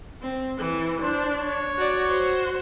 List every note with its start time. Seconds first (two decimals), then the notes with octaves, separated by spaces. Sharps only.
0.21 C4
0.58 E3
1.02 D4 C5
1.38 C#5
1.78 F#4 D5
2.08 F#4 C5